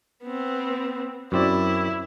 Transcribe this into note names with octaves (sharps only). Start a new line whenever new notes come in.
B3 C4
F#2 C4 E4 D5